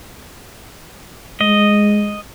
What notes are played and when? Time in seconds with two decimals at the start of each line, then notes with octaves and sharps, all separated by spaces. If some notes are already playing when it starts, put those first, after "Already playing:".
1.41 G#3 D#5